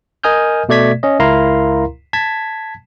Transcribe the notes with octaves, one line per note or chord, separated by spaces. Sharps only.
A#4 D#5 G#5 D#6 F6 G6
B2 A3 D5 G#6 B6
C#4 D#5
C#2 E4 A#4 F5 A#5 C6
A5 G#6 B6